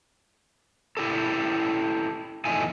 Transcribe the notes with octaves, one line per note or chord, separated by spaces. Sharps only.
E4 G4 A4
E2 F3 A3 D#4 E4 G#5